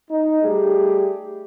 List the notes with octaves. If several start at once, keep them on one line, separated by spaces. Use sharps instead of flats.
D#4
G3 A3 G4 G#4